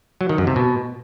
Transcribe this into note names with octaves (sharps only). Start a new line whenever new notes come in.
F#3
D#3
F#2
C3
B2